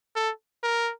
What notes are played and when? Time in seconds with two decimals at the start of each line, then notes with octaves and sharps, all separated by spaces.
0.16 A4
0.63 A#4